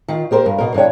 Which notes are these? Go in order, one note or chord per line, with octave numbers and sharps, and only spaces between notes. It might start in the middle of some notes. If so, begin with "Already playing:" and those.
D#3 F4
A#3 G4 A#4 C5
G2
B2 A#4
G2 E3 D4 C#5 G5